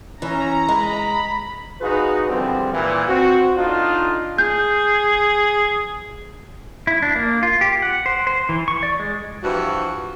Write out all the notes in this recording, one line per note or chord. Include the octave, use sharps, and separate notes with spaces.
E3 C#4 A#5
G#3 B5
D#4 F4 F#4 G#4 B4
D3 E3 F3 G3 B3 C4
A#2 E3
C4 F#4
A2 D4 D#4 F4
G#4 G6
E4
D4
A#3
F4
G4
F#5
C5
C5
E3
C#6
D5
G#3
G2 E3 F3 F#4